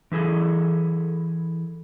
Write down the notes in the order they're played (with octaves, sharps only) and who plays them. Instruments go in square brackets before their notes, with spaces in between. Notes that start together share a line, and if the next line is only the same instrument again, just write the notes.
[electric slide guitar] E3 E4 G#4 A4